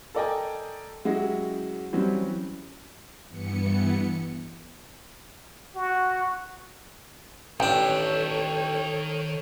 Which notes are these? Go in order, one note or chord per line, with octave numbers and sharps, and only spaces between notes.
A4 A#4 D5 D#5 G5 G#5
F#3 G#3 C#4 E4 F#4 G4
E3 F#3 G3 C4 C#4
G2 E3 B3 C#7
F#4
A1 D#3 D4 A4 C#5 E5 G5